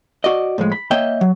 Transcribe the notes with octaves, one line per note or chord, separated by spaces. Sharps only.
F#4 D5 D#5
A2 F3 G#3
B5
A#3 C#5 D#5 E5 G5
F#3